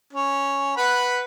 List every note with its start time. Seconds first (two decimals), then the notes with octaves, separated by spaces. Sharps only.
0.13 C#4
0.77 B4 F#5 B5